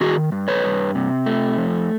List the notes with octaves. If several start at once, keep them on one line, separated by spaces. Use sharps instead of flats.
D#3 F#4 G#4
G2
B4 C#5
G2
C3
A3
F2